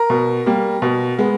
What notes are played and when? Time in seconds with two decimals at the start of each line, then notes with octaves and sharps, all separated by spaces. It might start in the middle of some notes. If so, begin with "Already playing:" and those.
Already playing: A#4
0.10 B2
0.46 G3 A#3
0.82 B2
1.19 G#3 B3